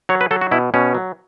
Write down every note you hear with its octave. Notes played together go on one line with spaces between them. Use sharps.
F#3 C#5
B4
F#3 A4
F#4
B2 E4
B2 C#4
F#3